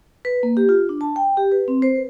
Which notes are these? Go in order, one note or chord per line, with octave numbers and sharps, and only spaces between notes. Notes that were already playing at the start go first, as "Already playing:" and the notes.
B4
A#3
G4
F4
D4
A5
G5
G4
B4
C4
C5
B4